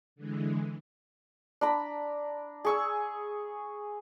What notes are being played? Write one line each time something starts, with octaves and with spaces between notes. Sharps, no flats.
D3 E3 G#3
D4 A#5 B5
G#4 C#6 E6